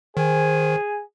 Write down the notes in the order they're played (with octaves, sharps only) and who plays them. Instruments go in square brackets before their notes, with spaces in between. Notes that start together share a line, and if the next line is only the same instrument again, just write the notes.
[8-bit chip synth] D#3 [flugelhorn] G#4 [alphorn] C5 [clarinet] G#5